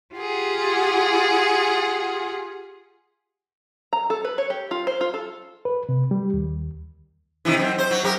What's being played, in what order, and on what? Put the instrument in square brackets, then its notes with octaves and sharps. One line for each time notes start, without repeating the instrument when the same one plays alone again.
[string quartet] F4 G4 G#4 F#5
[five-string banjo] A#5
A4
B4
C#5
G4
F4
C5
F4
A4
[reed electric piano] B4
C3
G3
D#2
[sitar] C3 D#3 E3
F#2 C4
C5
F#3
F#2 G4 A#4